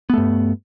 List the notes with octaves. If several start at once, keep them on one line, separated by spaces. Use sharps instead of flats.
G2 A3 B3